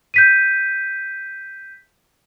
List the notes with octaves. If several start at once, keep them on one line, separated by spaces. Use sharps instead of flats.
G6 B6 D#7